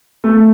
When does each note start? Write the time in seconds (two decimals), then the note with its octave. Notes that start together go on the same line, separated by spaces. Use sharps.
0.24 A3